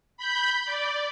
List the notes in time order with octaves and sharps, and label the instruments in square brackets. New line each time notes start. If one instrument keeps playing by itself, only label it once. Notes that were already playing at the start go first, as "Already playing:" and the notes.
[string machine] B5 G6
D5